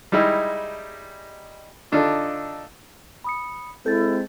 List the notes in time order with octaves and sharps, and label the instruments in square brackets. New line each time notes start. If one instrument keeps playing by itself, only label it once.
[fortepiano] G3 G#3 D#4 E4
D3 D4 D#4 F4 A4
[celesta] B5 D#6 C#7
[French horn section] G#3 C4 [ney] E4 [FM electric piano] A4 [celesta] G6 A6